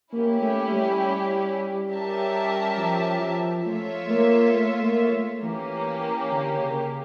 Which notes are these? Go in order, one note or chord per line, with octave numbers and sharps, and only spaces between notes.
A#3 C#4 E4 G4
A3
G3
C#4 G4 A#4 E5 A5
F3
F3
A3 F4 C#5 E5
A#3
A3
A#3
A3
E3 A#3 C#4 G4
D3
C#3